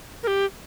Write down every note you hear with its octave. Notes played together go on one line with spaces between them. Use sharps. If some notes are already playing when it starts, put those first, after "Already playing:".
A#4
G4